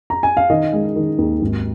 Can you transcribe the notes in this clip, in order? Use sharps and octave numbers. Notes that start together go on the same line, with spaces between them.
A#5
G#5
F5
D#3 D#5
G#3
D#3
D#2
G#1